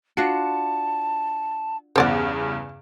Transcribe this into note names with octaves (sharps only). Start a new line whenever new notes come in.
D4 F4 F#4 A5 C#7
E2 G2 C#3 C5 D5 F#5